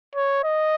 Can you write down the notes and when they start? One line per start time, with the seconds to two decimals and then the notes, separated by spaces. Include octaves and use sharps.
0.15 C#5
0.44 D#5